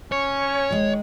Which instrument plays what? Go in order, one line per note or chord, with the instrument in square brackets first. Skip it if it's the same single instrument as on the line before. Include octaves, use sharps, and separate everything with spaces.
[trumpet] C#4 [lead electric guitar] C#5
[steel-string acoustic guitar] D#3 G#3